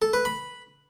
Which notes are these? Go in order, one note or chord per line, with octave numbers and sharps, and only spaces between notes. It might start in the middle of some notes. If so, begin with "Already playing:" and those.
A4
B4
B5